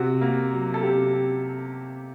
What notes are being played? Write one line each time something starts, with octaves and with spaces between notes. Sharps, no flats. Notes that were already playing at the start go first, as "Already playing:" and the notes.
Already playing: C3 F#4
A#3
F#3
A4
C3 G4